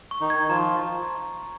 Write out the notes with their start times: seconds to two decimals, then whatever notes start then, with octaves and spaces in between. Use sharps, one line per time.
0.11 C#6
0.21 D#3 D#4
0.30 G#6
0.39 D#4
0.49 F3 F4 A#5